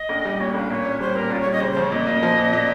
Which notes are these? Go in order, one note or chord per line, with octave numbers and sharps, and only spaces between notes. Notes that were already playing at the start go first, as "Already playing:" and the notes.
Already playing: D#5
A#1
G3
A#2 C#5
A#1 G5
F5
A#2 C#5
C#4
G3 C5
A#2 A#4
C#4 F4
C#5
G3
D#5
C#3 C5
C5
F2
C#5
A#2 D#5
A#3
F3
A#2
A#2